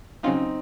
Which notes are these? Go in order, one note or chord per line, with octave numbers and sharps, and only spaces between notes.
C#3 F#3 C4 C#4 D#4 F4